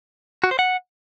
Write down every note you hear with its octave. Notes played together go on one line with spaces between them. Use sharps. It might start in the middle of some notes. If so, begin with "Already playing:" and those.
F#4
C5
F#5